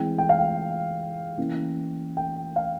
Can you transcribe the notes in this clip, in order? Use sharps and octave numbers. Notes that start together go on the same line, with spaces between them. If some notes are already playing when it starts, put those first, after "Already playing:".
Already playing: E3 G#3 C4 G5
G5
F5
G5
E3 A#3 C#4
G5
F5